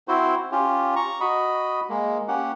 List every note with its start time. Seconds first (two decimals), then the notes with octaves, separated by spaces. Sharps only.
0.08 C4 E4 F#4 C5
0.52 C#4 F4 G4
0.96 A#5 C#6
1.20 F#4 D#5 B5
1.89 G#3 A#3
2.28 A#3 C#4 G4 F#5